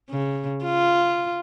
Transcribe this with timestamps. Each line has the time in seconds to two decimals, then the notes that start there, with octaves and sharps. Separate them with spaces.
0.10 C#3
0.65 F4